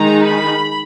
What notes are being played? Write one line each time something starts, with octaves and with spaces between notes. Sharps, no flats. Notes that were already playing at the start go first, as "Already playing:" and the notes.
Already playing: D#3 G#3 D#4 A#5
B5